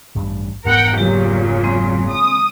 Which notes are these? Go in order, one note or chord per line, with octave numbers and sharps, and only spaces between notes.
A1 G2
F1 G#2 B3 A#4 F#5 G5
A#2 C#3 F#3 G4 G5
G#3 C4
D#6